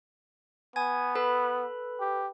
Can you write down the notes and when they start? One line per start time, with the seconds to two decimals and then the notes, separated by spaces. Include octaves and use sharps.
0.76 B3 G#5 G#6
1.15 A4 B4 B5
2.00 G4